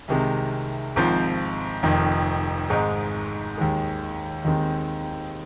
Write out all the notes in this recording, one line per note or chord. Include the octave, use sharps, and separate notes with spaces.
C2 C3 D#3 G#3
G#1 G#2 F3 C4
F1 F2 D#3
G#1 G#2 G#3 D#4
D#2 D#3 G#3
D#2 D#3 G#3 C4